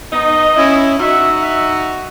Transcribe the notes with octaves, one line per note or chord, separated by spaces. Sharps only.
B3 D#4 D#5
C#4 E4
D#4 F#4 E5
E5